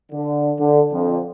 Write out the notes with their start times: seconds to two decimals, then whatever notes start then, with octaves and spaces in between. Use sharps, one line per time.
0.12 D3
0.60 D3
0.93 F2